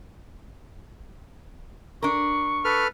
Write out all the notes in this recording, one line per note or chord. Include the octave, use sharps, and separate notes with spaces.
D4 A#4 C#6
A4 B4 F6